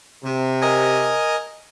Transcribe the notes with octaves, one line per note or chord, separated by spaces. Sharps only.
C3
A#4 D#5 G#5